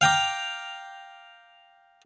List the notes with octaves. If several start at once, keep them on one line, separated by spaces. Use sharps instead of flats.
F5 G5 A#5 D6